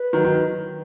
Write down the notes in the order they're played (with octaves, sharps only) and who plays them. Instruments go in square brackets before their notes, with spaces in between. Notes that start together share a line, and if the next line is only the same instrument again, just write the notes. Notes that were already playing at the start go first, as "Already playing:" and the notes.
Already playing: [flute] B4
[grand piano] D#3 F#3
D#3